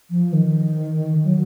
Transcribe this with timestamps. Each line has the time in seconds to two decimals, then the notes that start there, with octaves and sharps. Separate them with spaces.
0.11 F3
0.33 D#3
1.24 F#3